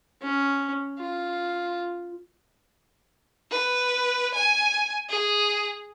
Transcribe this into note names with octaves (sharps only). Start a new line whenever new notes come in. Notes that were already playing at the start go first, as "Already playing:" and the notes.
C#4
F4
B4
G#5
G#4